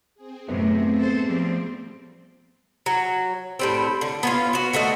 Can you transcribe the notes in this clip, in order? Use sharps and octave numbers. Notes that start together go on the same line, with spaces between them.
C4 G#4
F#2 A2 C3 A3 B3 C#4
A4 C5
F3 G3 C4
F#3
A2 G3 C4
D3
B3 C#4 F4
B3 F#4
D3 A3 F#4 D#5